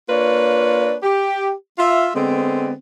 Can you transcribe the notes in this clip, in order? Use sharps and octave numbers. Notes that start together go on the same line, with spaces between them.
A#3 D4 F4 B4 C#5
G4
F4 E5
D3 G#3 B3 C4